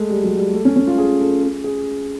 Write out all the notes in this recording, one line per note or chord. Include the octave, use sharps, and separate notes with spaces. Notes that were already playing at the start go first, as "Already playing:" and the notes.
Already playing: G#3 A3
G3
F#3
G3
A3
C#4
C#4
F4
G#4
A4
G#4
G#4